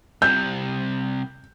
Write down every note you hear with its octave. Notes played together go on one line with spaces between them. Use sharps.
C2 C3 G6